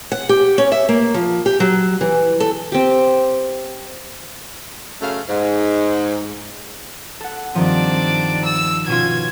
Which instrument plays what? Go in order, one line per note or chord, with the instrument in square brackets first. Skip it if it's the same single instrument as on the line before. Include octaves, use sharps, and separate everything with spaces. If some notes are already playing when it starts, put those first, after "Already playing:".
[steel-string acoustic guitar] F#5
G4
C#4
E5
A#3
F3
G4
F#3
E3
A4
[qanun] C4 G4
[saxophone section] F#2 C#3 A3 F5
G#2
[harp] A4 F#5
[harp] G2 D#3 F3 [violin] C4 D4
[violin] E6
[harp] B2 C#4 F4 [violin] G#6